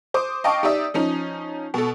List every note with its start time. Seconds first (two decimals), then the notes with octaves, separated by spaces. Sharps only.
0.14 C5 D6 D#6
0.44 D#5 F5 G5 A5 C#6 D6
0.63 D#4 G4 D5 E5 D#6
0.94 F3 C#4 D#4
1.74 B2 A4